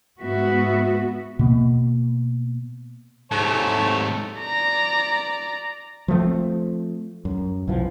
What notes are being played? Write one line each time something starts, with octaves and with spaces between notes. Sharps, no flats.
G#2 B3 F#4 E5
B2 A#3
G#2 C3 A3 C#5 A5
D5 A#5
F3 A3 C4
F#2
B1 E3 F3